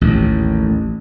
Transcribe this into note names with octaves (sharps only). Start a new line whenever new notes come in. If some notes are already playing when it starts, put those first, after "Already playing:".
A1 D#2